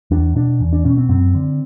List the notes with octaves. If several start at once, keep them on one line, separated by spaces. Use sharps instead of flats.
E2 D4
B2 D4
E2
D4
B2 C#4
C4
F#2 C4
D3